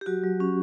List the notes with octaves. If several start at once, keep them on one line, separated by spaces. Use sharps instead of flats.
G4
F#3 F#4
F#3
C#4